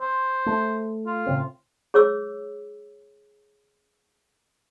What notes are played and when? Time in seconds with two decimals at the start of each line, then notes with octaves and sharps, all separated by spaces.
0.01 C5
0.46 A3
1.07 F4
1.27 A2 C#3 C4
1.94 G#4 C#5 D6 E6